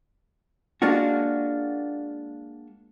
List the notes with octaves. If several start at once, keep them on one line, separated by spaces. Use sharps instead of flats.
G#3 A#3 D4 F4 F#4